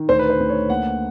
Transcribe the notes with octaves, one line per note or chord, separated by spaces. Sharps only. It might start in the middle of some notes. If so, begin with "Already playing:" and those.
Already playing: D#3
D2 C5
B4
C5
D2
C#5
A#3 F#5